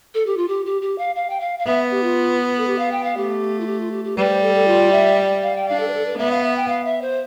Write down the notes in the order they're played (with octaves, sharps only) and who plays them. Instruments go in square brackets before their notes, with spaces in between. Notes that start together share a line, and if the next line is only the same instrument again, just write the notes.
[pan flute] A4
G4
F4
G4
G4
G4
F5
F5
G5
F5
F5
[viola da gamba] B3 [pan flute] E5
[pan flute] G4
F4
A4
G4
F5
G5
F5
[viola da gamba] A3 [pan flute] G4
[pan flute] F4
G4
F4
G4
G4
[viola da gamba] G3 [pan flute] B4
[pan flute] C5
A4
A4
F4
E5
F5
G5
[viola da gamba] D4 [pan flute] F5
[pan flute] A4
B4
A4
B4
[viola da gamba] B3 [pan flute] E5
[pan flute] F5
E5
G5
F5
E5
C5